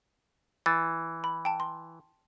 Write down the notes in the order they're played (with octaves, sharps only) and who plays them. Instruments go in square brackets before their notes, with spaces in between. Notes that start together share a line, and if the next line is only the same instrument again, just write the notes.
[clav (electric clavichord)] E3 [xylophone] A6
[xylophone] B5
G5 A5
C6